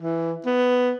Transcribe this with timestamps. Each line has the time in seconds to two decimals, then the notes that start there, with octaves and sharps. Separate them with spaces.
0.01 E3
0.46 B3